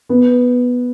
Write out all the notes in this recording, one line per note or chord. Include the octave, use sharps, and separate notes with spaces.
B3